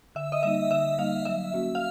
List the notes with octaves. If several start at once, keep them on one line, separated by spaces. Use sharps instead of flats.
D3 E5
D#5
G3 A#3 D#4 E5
D3 E5
G3 A#3 D#4 F5
F#3 E5
A#3 C#4 F#4
F5